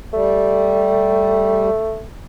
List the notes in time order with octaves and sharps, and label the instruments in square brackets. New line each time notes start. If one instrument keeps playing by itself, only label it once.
[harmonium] G3 [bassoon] A3